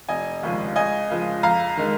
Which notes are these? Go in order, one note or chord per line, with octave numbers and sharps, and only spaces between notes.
F1 D#5 G#5
D#2 C#3 F3 G#3
C#2 D#5 G#5
C#3 F3 G#3
F2 F5 A#5
D#3 G#3